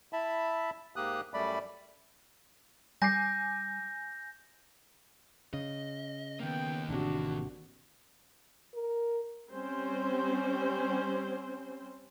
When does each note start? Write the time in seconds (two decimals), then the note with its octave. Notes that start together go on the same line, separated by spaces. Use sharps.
0.13 E4 E5 A5 B5
0.96 G#2 A#3 G4 D#6 F#6
1.34 F#2 G3 A3 D5 B5
3.02 G3 G#5 D6 G6 A#6 C7
5.54 C#3 D#5
6.40 D#3 A#3 B3 G5
6.89 A1 C3 D4 F#4
8.74 A#4
9.52 G3 C4 C#4 C5